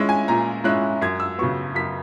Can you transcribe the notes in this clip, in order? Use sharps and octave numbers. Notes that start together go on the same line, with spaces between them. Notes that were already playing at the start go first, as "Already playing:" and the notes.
Already playing: G#3 C#4 E4 E5
G#5
A#2 A#5
G#3 C#4 E4 F#6
F#2 G#6
E6
C#3 F#3 B3 C#6
F#2 B6